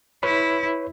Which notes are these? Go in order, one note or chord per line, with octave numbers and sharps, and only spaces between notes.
E4 B4 C#5 B5